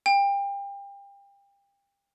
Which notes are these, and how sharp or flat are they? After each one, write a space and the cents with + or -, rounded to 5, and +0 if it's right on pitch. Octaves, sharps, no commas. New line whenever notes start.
G5 +30